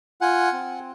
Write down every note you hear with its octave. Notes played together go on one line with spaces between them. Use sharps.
F4 F#5 G#5
C4